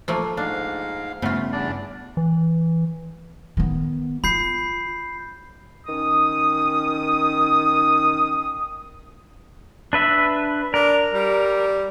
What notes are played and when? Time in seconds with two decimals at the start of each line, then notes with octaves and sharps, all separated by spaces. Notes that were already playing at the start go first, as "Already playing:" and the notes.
0.08 F3 A3 A#3
0.37 G#2 D4 F5
1.22 G2 C#3 A3 B3 F4
1.52 E2 D4 D5
2.17 E3
3.57 D#3 B3
4.24 F4 B5 G6 C7
5.87 D#3 C#4 D#6
9.93 D4 B4 E5
10.74 D4 A#4
11.13 G3